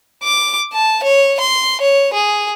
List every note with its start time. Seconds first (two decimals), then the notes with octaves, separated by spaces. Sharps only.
0.23 D6
0.73 A5
1.03 C#5
1.40 C6
1.81 C#5
2.14 G#4